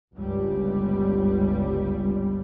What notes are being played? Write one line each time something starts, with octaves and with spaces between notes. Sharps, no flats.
G1 C#2 G3